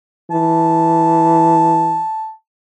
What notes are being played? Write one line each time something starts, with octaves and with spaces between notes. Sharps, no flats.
E3 A5